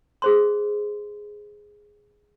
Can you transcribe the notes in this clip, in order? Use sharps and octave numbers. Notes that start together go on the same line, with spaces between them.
G#4 C5 C6